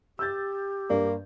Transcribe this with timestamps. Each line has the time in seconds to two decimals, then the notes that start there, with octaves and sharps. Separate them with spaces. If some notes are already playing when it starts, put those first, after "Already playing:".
0.19 G4 E6 G6 A6
0.90 G2 A#3 D5